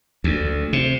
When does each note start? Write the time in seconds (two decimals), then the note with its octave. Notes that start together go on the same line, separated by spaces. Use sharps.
0.24 D2
0.73 C3